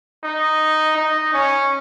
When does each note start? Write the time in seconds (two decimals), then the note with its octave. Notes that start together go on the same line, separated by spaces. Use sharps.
0.23 D#4
0.97 D#4
1.33 C#4